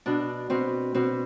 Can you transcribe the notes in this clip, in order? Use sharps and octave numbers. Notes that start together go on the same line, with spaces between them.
B2 D4
B2 C4
B2 C4